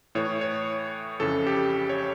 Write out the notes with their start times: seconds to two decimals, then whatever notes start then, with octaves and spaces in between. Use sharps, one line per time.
0.15 A2 E3 C#5
0.41 C#5
1.20 F2 C#3 E3 A4
1.47 G4
1.89 C#5